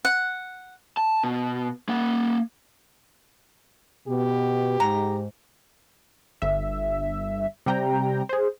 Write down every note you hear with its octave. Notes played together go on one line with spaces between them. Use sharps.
F#5
A5
B2
A#3 F#5
B2 G4
G#2 A#5
G1 E5
C3 G3 G5 A#5
G#4 C5